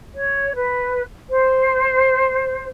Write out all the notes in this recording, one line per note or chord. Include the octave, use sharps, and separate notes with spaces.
C#5
B4
C5